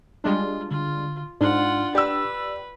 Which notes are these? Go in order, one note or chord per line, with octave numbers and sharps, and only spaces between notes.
G3 G#3 D4 F4
D3 F4
G#2 D4 F4 F#5
G4 B4 D5 E6